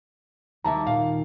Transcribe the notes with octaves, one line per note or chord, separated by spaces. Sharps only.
D#2 A#3 E5 A5 A#5
A#2 F5